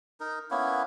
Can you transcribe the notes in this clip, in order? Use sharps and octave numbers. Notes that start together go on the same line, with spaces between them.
D#4 A#4
A#3 B3 C#4 E4